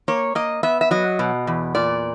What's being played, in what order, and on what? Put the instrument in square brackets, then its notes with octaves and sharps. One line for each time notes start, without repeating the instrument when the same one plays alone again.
[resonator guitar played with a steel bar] A#3 C#5
A#3 D#5
B3 E5
E5
F#3 D#5
B2
E2
A#2 D5